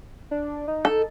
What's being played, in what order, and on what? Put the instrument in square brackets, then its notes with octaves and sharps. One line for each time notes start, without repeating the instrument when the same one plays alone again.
[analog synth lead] D4
D#4
[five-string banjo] A4